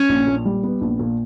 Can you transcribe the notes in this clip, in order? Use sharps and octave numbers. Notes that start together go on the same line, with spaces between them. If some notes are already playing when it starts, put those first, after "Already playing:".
Already playing: C#4
A#1
A#2
G3
B3
A#1
A#2